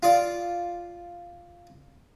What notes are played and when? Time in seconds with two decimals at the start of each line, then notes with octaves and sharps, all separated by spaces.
0.03 F4 D5